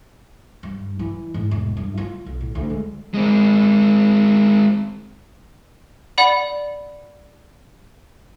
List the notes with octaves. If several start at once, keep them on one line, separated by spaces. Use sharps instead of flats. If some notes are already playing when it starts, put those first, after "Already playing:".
G2
E3
G#2
E1
G2
F4
B1
A2
D2
G#3
G#3 C4
D5 F#5 B5